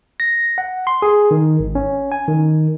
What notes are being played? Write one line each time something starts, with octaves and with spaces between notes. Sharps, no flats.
A#6
F#5
C6
G#4
D#3
G#1
C#4
G#5
D#3